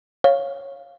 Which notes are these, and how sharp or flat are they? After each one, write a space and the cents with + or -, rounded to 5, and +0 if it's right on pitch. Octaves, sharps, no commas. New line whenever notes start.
C#5 -5 F5 +0